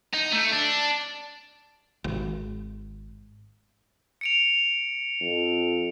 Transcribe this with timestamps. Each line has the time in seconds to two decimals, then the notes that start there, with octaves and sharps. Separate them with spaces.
0.13 D#4
0.32 A3
0.51 D4
2.04 G#1
4.21 C#7 D7 F7
5.21 F2